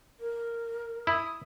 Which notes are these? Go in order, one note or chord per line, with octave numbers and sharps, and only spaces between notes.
A#4
E4 D#6